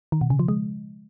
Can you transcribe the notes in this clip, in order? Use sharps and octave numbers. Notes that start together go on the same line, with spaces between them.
D#3
B2
C#3
F3
G#3